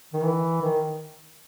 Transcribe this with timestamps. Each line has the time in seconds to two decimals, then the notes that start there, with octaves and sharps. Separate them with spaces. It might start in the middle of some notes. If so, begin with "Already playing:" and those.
0.13 D#3
0.23 E3
0.61 D#3